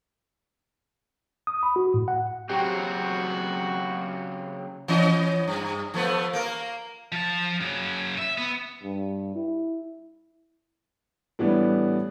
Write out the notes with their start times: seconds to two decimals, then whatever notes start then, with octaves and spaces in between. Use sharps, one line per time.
1.47 D#6
1.63 B5
1.76 F#4
1.94 A2
2.08 F#5
2.49 C#3 F#3 C4 F#4 G4
4.88 E3 C#4 D#5
5.48 G2
5.94 F3 A3 B3
6.33 A#3 A#4
7.12 F3 A5
7.61 C#3 F#3
8.18 E5
8.38 B3
8.83 G2
9.35 E4
11.39 A2 E3 G3 B3 D4